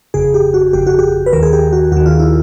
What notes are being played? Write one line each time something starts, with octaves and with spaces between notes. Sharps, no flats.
G1 F2 C#3 G#4
G4
F#4
G1 F2 C#3 G4
F#4
G4
B4
D#2 D#3 A#4
G#4
G4
F#4
D#2 D#3 F#4
F4
E4